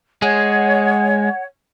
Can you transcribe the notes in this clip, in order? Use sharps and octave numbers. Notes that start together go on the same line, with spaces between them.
G#3 G#4 C#5 F#5